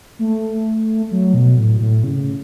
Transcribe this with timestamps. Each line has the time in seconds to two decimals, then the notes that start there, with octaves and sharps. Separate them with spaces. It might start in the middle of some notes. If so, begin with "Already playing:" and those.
0.19 A3
1.11 F#3
1.34 B2
1.58 A2
1.80 A2
2.03 C#3